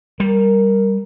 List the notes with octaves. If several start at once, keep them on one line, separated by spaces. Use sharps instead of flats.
G3 A#4